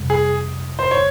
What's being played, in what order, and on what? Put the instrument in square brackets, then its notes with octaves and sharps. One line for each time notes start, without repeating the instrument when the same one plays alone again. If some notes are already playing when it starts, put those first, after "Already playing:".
Already playing: [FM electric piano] F2 C3 G3
[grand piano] G#4
C5
C#5